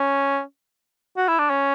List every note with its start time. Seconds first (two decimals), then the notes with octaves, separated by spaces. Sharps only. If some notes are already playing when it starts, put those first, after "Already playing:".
Already playing: C#4
1.17 F#4
1.28 E4
1.39 D4
1.50 C#4